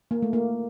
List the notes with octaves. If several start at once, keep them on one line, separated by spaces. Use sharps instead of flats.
A#3
A3
A#3